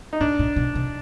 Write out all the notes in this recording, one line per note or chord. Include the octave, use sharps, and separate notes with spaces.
D#4
A2 D4
A#2
B2
C3